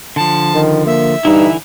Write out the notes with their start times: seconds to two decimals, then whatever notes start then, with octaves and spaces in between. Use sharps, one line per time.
0.16 D3 F3 A5
0.54 D#3
0.86 A#3 E5
1.25 G2 D3 E3 D#4 E4